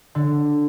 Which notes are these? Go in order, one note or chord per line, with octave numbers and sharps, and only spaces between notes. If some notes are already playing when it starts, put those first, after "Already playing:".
D3